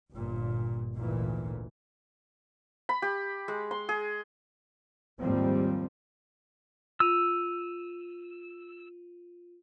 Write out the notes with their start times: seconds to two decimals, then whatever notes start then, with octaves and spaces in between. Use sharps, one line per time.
0.11 G1 A#2
0.96 G#1 D2 A#2 E3
2.89 B5
3.02 G4
3.48 G#3
3.71 C6
3.89 G#4
5.19 D#2 G#2 F3 G3 A#3 C4
7.00 F4 E6 D#7 F7